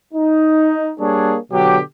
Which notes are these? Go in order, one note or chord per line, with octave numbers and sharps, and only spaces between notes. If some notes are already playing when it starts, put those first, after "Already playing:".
D#4
G3 A#3 D4 G#4 C#5
B2 D3 F#3 G4